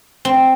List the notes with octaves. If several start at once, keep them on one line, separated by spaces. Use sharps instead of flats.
C4